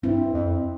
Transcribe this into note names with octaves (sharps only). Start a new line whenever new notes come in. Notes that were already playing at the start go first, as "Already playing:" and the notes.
G2 C4 E4
F2